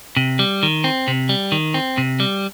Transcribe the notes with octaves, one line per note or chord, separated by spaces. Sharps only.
C3
G3
D#3
C4
C3
G3
D#3
C4
C3
G3